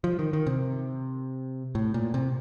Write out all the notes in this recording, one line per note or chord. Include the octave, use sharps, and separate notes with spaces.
F3
D#3
D#3
C3
A2
A#2
C3